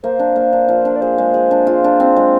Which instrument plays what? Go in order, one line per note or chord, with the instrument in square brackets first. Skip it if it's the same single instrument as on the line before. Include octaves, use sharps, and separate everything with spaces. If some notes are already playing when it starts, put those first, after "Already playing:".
[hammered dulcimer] A#3 [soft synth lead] C5
[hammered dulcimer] D4
A#3
D4
F3
D4
[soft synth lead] D5
[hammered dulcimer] G#4 [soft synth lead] C5
[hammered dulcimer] G#3
G#4
D4
F4
D4
C4
G#3